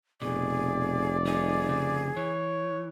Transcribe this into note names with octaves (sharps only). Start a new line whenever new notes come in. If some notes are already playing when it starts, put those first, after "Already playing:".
F1 B2 G#4 D5
G3 D#4 G#4
C#3
E3 C#5